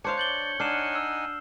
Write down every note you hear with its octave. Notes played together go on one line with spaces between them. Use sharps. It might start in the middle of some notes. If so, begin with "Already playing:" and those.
D4 A#4 C5 C#5 F5
D5 G6 F#7 G7
D4 D#4 F#5 G#5 F6 C7 E7
E6